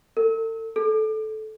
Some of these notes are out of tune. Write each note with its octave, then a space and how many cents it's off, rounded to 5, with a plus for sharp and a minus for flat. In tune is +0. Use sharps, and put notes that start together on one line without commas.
A4 +40
A4 -15